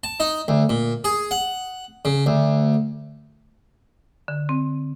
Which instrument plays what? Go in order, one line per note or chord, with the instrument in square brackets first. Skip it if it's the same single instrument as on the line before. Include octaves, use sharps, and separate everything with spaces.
[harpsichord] A5
D#4
D2
A#2
G#4
F#5
C#3
D2
[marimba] D3
C4